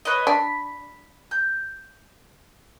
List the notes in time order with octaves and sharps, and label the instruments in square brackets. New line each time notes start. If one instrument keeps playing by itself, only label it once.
[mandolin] B4 C#5 D#5
[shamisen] D4 [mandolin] B5
[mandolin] G6